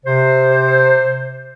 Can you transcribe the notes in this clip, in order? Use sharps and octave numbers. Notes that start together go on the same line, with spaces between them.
C3 C5